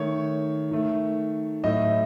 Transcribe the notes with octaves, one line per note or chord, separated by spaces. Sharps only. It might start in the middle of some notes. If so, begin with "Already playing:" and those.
Already playing: D#3 A3 C#5
D#3 A3
A2 F#3 A3 D#5